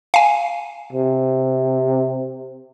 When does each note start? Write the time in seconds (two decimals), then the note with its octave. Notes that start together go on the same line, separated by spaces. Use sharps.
0.14 F5 G#5
0.93 C3